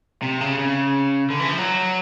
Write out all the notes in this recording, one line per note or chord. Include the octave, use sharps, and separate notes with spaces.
C3
C#3
C#3
D3
E3
F3
F#3